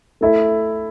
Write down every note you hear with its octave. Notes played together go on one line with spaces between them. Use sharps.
A3 E4 A4 E5